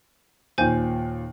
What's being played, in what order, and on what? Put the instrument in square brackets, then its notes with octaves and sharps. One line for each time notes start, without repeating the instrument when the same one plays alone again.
[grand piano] D#2 A#2 [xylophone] C5 G#5 G6